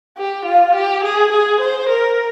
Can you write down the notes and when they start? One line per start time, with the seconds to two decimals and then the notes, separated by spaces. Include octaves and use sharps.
0.17 G4
0.45 F4
0.74 G4
1.04 G#4
1.32 G#4
1.61 C5
1.89 A#4